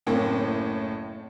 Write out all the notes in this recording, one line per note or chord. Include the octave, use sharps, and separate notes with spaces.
F#1 A2 A#3 C4 C#4